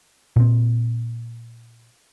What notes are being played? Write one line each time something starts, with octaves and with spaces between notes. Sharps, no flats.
A#2 C4